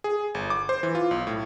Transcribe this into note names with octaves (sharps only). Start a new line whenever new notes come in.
G#4
G1
D6
C5
E3
F4
B1
A2